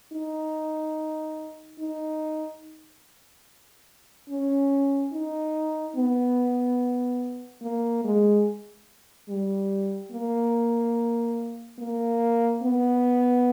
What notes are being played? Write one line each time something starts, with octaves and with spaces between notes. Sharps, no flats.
D#4
D#4
C#4
D#4
B3
A#3
G#3
G3
A#3
A#3
B3